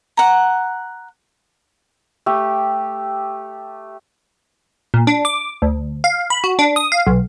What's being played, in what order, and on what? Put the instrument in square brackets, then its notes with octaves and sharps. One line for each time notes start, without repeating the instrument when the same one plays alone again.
[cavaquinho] F#5 A#5
[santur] A3 G4
[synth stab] A#2
D4
D6
D2
F5
B5
F#4
D4
D#6
F5
B1